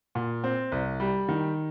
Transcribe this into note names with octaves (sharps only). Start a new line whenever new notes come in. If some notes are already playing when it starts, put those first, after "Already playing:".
A#2
C4
C2
G3
D#3